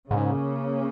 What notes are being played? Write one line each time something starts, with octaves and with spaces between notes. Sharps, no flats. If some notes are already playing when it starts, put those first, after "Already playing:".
G#2 C#3 A#3 C#4